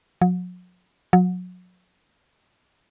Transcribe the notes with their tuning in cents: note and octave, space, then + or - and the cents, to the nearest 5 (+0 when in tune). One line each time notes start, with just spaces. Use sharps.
F#3 -45
F#3 -35